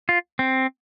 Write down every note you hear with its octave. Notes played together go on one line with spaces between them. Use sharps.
F4
C4